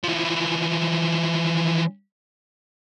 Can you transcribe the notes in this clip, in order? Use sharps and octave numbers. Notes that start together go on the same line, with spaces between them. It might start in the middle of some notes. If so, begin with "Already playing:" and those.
E3 F3